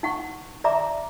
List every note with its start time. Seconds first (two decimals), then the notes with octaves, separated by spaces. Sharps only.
0.03 D#4 F#5 C#6
0.64 D5 E5 A#5 D6